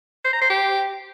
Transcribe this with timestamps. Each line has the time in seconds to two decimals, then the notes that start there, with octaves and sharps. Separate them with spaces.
0.24 C5
0.33 A#5
0.41 C5
0.50 G4